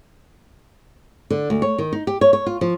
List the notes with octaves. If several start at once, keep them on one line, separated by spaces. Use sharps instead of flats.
D3
D2
C#5
D#3
D#4
G4
C#5
C#5
F4
F3